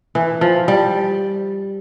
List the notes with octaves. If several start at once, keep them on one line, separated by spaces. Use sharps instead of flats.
E3
F3
G3